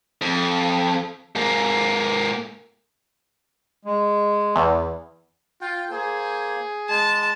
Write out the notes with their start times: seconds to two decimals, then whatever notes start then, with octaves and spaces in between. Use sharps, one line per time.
0.21 F2
1.35 G#2 A#3
3.85 G#3
4.56 E2
5.61 F4 G5
5.91 A#3 G#4 C5
6.89 G#3 A5